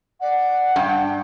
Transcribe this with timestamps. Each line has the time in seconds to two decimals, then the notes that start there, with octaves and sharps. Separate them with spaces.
0.21 D5 F#5
0.76 G2 G5